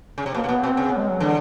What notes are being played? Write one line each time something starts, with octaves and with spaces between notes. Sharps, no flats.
C#3
C3
B2 A#3
C3
B2 B3
B2 C4
C#3
B3
G3
G#3
F#3
D3 E3